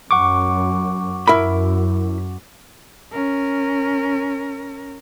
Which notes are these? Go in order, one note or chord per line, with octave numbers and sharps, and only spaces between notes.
F#2 F#5 C#6 D6
F#2 E4 A#4 B5
C#4 A#4